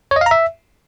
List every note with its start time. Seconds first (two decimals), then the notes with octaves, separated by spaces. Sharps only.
0.11 C#5
0.16 D#5
0.21 F5
0.26 A#5
0.31 E5